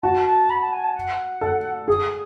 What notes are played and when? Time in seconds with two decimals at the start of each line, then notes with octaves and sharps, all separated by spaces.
0.02 F#4 A5
0.26 A5
0.50 B5
0.60 A5
0.72 G#5
0.83 A5
0.95 F#5
1.41 A4
1.88 G#4 D#6